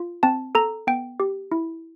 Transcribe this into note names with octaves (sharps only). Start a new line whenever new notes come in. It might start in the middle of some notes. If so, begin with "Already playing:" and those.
Already playing: F4
C4 A5
A4 A#5
B3 G5
G4
E4